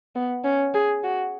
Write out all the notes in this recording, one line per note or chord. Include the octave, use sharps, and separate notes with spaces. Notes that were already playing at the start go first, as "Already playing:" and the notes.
B3
C#4
G#4
F#4